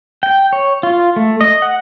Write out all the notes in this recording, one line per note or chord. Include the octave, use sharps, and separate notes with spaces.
G5
C#5
F4
A3
D#5
F#5